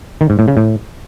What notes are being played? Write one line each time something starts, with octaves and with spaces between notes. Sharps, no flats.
D#3
G#2
A2
C#3
A2